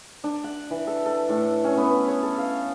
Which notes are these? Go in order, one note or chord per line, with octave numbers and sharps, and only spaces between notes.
D4
F#5
E3
A4
A4
A2
C#4
B3
C#5
A4
F5